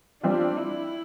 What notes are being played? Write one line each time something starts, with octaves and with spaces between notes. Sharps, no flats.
G3 C4 D4 F4
E4